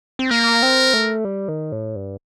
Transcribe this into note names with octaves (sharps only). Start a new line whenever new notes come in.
C4
A#3 A#4
C4
A3
G3
D#3
A2
G2